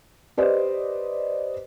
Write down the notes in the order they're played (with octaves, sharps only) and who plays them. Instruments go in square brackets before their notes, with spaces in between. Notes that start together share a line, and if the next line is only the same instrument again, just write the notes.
[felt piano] G4 B4 C5 D5 D#5